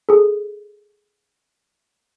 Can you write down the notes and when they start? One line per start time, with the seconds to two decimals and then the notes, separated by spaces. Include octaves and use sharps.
0.09 G#4 A4